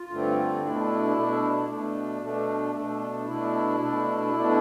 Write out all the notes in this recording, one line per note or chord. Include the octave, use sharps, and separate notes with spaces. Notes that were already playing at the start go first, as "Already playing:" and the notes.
Already playing: F4
G2 D3 A3 C4
B2 A3 D4 E4
B2 A3 D4
B2 A3 D4
B2 A3 D4
B2 A3 D4
B2 A3 D4 E4
B2 A3 D4
B2 A3 D4